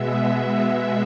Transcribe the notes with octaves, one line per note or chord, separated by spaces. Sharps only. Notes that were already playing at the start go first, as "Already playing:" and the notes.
Already playing: B2 G#3 B3 E5